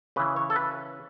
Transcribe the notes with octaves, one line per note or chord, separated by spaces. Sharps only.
C#3 E3 B4
C#5
A4
B4